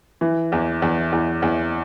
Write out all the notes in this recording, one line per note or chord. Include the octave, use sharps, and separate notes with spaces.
E3
E2
E2
E2
E2